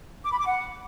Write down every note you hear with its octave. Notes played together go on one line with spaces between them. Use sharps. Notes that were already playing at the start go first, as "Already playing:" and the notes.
D6
B5
D6
F#5